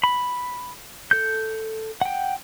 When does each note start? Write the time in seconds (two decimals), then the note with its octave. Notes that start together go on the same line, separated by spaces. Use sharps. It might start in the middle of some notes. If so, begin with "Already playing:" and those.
0.04 B5
1.11 A4 G6
2.01 F#5 G5